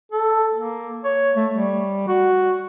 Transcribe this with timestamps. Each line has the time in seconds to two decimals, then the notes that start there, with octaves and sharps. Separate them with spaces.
0.12 A4
0.54 A#3
1.04 C#5
1.36 A3
1.52 G3
2.08 F#4